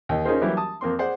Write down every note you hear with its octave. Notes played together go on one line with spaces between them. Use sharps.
D#2 D#5
C#4 D#4 F4 G#4 A#4 C5
E3 F#3 G3 A#3 E4 G4
A5 D#6
F2 A#3 C4 C6
G#4 C5 D5 F#5